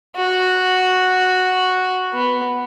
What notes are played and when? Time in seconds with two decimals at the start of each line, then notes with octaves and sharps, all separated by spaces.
0.16 F#4
2.13 B3